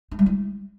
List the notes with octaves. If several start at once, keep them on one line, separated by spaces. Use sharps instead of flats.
D#4
G3
E4